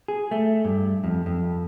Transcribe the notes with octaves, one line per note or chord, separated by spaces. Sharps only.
G#4
A3
G2
F2
F2